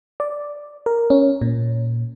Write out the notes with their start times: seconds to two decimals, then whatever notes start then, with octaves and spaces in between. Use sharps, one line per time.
0.20 D5
0.86 A#4
1.10 C#4
1.41 A#2